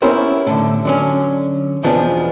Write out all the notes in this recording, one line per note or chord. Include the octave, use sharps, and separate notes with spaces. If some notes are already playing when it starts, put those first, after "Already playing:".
B3 C#4 E4 G4 A#4 C5
A2 D3
D3 F#3 C#4
E2 B2 F3 B3 D4